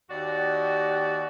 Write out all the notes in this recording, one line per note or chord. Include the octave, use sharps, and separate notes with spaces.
D#2 F#4 G4 D5